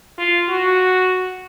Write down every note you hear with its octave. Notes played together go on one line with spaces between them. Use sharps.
F4
F#4